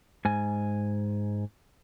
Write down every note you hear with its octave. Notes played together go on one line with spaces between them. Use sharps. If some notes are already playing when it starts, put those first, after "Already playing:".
G#2 G#5